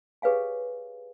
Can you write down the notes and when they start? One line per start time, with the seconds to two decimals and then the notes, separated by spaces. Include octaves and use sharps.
0.22 G4 G#4 B4 C#5 F5 G#5